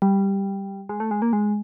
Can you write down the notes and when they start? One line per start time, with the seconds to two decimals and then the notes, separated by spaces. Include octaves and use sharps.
0.02 G3
0.89 G#3
1.00 A3
1.11 G#3
1.22 A#3
1.33 G#3